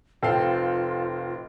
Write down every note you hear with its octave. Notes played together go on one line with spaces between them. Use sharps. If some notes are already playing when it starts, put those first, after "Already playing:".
F1 C4 F4 A4 F5 G5